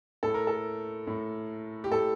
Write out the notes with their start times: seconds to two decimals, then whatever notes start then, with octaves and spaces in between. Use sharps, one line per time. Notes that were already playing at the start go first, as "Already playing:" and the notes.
0.23 A2 A4
0.34 A#4
0.47 A4
1.07 A2
1.84 G4
1.91 A2 A4